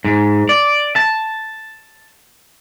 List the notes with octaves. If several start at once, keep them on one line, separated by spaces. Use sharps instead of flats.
G#2
D5
A5